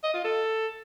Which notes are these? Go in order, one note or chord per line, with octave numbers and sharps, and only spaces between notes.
D#5
F4
A4